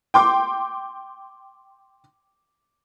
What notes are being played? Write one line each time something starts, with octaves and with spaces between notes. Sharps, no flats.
G5 C6 D6